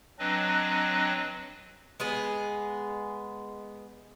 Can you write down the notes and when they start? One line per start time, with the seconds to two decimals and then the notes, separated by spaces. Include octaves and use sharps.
0.19 F#3 C4 D4 B4 D#5
2.00 G#3 B3 G#4